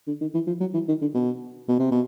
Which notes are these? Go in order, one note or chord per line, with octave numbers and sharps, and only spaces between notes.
D3
D#3
E3
F3
F#3
E3
D#3
D3
B2
B2
C3
B2